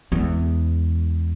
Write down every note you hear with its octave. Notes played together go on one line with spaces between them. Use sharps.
E2 G#3